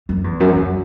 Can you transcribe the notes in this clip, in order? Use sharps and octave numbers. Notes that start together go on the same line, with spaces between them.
F#2
E2
F#2
F#2